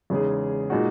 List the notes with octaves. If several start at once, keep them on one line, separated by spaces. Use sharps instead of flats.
E2 C#3 G#3 D#4 G#4
A#2 G#3 D#4 F#4